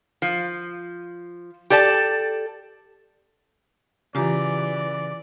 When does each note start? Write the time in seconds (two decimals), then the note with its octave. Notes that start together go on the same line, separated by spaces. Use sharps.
0.22 F3
1.70 G4 A4 D5 A5
4.15 C#3 E3 F4 G4 D5 A#5